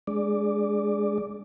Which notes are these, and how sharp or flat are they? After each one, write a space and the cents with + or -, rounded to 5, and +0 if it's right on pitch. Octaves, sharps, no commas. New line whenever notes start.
G#3 +0 D4 -15 D5 +0